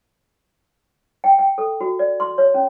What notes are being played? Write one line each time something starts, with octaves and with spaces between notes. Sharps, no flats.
G5
G5
A4
F#4
D5
C6
C#5
C#4